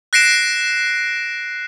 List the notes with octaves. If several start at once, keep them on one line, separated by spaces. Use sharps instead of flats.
F#6 A#6 C7 D7 E7